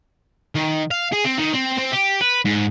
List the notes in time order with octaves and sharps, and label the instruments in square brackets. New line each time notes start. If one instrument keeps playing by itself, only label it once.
[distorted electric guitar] D#3
F5
G#4
C4
D#3
C4
C4
G4
B4
G#2